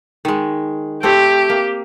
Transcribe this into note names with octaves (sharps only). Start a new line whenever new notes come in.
D#3 G#3
A3 C4 G4 C#5
A#3